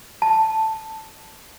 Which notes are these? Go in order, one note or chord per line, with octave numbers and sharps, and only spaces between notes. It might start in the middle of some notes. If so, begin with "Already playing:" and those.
A5